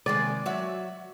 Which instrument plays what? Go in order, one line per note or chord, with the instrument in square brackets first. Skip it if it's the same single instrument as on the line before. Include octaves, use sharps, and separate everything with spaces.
[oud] C3 D#3 G#3 [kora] D5
[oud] F#3 F#4 E5